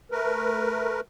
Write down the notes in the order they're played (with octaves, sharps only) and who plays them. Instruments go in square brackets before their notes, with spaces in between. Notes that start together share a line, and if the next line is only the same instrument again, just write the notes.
[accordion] A3 A#4 B4